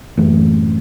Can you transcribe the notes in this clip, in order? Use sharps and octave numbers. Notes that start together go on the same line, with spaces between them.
A1 F#2 E3 A3